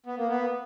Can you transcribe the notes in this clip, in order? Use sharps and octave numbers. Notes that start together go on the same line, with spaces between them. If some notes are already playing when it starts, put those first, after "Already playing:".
B3
A#3
B3